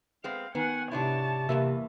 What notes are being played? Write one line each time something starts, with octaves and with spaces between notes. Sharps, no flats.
G#3 B3 C4 F5
D#3 B3 F#5 G#5
G#2 C3 D4 E4 C#5 A5
E2 G2 C3 E3 A#3 E5